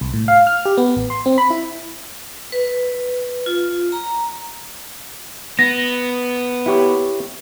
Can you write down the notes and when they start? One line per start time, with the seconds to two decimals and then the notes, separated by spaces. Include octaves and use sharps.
0.01 C2
0.13 A2
0.28 F5
0.47 F6
0.65 G4
0.77 B3
0.96 A1
1.10 C6
1.26 C4
1.38 B5
1.50 E4
2.52 B4
3.46 F4
3.92 A#5
5.59 B3 A#6
6.66 E4 G4 C#5